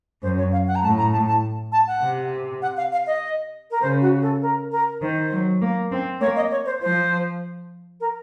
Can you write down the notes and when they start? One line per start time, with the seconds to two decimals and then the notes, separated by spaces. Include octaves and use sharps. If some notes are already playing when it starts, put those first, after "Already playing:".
0.23 F#2 C5
0.38 C#5
0.52 F5
0.67 F#5
0.75 A#5
0.83 A2 A5
0.98 A#5
1.12 A5
1.27 A5
1.72 A5
1.87 F#5
2.02 C3
2.62 F#5
2.77 F5
2.92 F5
3.07 D#5
3.71 A#4
3.82 C#3 C5
4.01 F#4
4.22 A4
4.42 A#4
4.72 A#4
5.01 D#3 C5
5.32 F#3
5.61 A#3
5.92 C4
6.21 A#3 C#5
6.36 D#5
6.51 C#5
6.66 C5
6.81 F3 C5
8.00 A#4